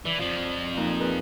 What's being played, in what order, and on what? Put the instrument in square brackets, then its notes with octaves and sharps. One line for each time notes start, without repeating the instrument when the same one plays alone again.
[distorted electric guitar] E3 [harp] D5
[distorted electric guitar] F2 F3
[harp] A#2 D#4 D#6
G#4 A#4 B4